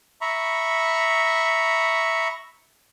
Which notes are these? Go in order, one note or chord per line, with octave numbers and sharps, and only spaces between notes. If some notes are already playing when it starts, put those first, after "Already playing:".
E5 A#5 B5 C#6